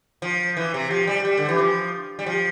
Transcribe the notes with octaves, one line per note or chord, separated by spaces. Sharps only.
F3
E3
C3
F3
G3
G3
D3
E3
F3
G3
F3